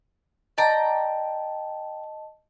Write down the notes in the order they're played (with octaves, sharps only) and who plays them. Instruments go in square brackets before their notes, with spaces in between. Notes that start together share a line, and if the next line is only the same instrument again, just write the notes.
[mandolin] D5 G5 A#5 [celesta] D#5 A5